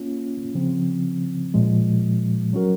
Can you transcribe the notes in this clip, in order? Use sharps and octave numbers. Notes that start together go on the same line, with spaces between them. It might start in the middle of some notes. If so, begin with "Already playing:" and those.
Already playing: A#3 C#4 F4
C#3 F3 C4
A#2 F3 G#3
F#3 C#4 F#4 A#4